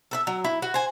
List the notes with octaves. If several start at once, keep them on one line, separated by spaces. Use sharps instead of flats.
A4 B4 E5
F#3
E4
F#4
C5 G#5